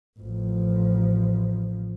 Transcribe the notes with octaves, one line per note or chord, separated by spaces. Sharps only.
A1 F3